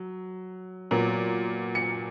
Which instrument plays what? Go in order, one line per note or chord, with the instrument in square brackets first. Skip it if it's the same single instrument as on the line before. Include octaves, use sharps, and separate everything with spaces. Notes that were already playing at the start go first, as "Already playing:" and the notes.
Already playing: [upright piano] F#3
A#2 F#3 B3
C#7